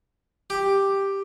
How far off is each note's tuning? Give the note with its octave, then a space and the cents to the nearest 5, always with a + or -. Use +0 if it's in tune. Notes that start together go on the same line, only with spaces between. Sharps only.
G4 +5